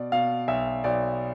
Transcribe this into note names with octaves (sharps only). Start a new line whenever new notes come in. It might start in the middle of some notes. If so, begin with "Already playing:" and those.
Already playing: B2 D5
B2 F5
B1 E5
B1 D5